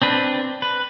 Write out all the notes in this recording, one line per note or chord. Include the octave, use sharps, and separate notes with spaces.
C4 D4 B4
B4